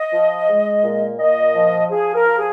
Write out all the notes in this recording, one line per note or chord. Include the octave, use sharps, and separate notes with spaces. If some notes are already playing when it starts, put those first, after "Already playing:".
Already playing: D#5
F3
G#3
A#2
A#2 D#5
F3
F3 G#4
A#4
F3
G#4